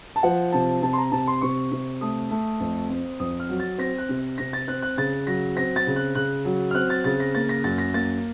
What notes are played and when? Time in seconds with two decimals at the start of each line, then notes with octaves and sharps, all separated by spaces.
0.16 A5
0.23 F3 F#5
0.53 C3 A5
0.82 C3 A5
0.93 C6
0.98 A#5
1.12 C3 A5
1.27 C6
1.41 C3 C#6
1.72 C3
2.01 A3 D#6
2.31 A3
2.60 F2
2.89 C4
3.20 F2 D#6
3.40 F6
3.49 F#3
3.60 A6
3.78 C4 A#6
3.98 F#6
4.09 C3
4.38 C3 A#6
4.53 A6
4.68 C4 F#6
4.82 F#6
4.97 C#3 A6
5.27 F#3 A#6
5.56 C4 A#6
5.76 A6
5.87 C#3
5.96 F#6
6.15 C#3 F#6
6.45 F#3
6.71 F6
6.75 C4 F#6
6.90 A6
7.04 C#3 A6
7.20 A#6
7.35 A#3 A6
7.49 A#6
7.64 F#2 A6
7.78 A#6
7.94 A#3 A6